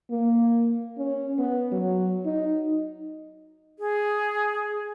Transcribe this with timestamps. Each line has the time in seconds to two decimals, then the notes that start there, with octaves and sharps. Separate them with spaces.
0.10 A#3
0.98 C#4
1.38 B3
1.72 F#3
2.26 D#4
3.79 G#4